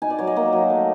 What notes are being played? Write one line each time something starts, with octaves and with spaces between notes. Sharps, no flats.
D#4 G#5
D5
F#3 C#5
D#5
A#3
F#3
A3